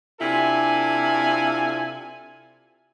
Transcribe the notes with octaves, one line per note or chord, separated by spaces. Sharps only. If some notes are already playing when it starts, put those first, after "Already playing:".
C3 D4 E4 F4 A4 G#5